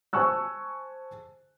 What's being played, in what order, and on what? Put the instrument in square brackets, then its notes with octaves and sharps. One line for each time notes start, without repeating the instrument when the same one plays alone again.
[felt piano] C5 G#5 A5 C#6 E6 F#6